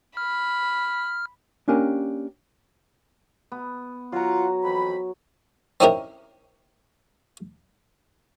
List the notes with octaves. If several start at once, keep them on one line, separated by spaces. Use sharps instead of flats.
B5 F6
A#3 C#4 D4 G4 A#4 G#5
B3
F#3 F4 F#5 A#5
F2 E3 B5
C4 C#4 D#4 E4 G4 A#4